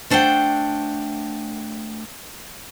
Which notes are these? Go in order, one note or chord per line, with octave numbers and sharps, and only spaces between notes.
A3 D4 C5 F#5 G5